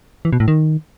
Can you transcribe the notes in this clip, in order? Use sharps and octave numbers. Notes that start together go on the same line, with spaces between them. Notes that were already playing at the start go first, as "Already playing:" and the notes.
E3
B2
A2
D#3